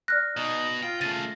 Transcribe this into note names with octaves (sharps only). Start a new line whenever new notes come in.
D5 F6 F#6 A#6
B2 D#4
F4 G5
C#3 A3 A6 D#7